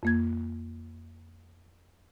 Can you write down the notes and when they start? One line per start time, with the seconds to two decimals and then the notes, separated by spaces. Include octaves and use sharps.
0.03 F2 A#3 G#6